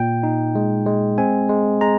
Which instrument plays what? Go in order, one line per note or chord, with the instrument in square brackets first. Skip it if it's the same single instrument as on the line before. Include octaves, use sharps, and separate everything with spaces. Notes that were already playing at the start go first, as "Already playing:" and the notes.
Already playing: [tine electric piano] A#2 G5
D#4
G#3
G#3
C4 G#5
G#3
G#3 A#5